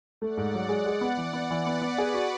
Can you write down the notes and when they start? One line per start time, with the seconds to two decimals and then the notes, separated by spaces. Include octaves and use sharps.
0.21 A3 D5 F#5
0.37 G#2
0.54 F#3
0.69 G#3 D5 F#5
0.86 G#3
1.01 B3
1.17 E3
1.33 B3
1.51 E3
1.66 B3 B4 D5
1.82 B3
1.98 G#4
2.14 F#4